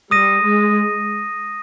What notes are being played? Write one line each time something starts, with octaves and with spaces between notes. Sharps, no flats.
G3 D#6 A#6 D#7
G#3